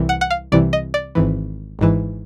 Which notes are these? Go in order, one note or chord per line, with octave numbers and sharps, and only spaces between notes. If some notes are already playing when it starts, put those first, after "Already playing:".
Already playing: C2 C3 E3
F#5
F#5
F5
C2 C3 E3 D5
D#5
D5
G#1 G#2 E3
G#1 G#2 E3